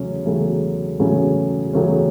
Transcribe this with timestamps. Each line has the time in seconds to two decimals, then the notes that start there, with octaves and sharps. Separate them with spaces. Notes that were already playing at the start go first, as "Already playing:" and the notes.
Already playing: E2 C#3 F#3 A3 C#4
0.26 E2 C#3 F#3 A3 C#4
1.00 E2 C#3 F#3 A3 C#4
1.73 E2 C#3 F#3 A3 C#4